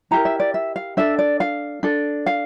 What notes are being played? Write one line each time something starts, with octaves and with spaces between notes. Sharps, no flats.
E4 G4 A#4 A#5
E5
D5
E5
F5
D4 A4 E5
D5
F5
D4 A4
F5